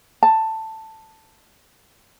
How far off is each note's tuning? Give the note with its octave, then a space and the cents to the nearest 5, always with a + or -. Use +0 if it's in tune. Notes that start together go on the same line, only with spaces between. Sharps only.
A5 +10